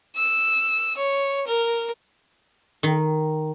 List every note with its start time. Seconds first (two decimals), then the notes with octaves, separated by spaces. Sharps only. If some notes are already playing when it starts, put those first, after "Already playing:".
0.16 E6
0.97 C#5
1.47 A#4
2.83 D#3